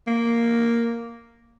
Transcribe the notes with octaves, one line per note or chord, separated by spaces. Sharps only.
A#3